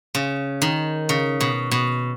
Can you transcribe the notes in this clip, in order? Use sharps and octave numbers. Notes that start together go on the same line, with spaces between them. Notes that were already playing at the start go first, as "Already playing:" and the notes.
C#3
D#3
C#3
B2
B2